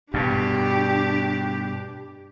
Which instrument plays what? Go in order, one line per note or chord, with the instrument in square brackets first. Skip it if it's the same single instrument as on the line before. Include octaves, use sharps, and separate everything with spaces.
[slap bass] G2 B2 [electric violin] D4 G4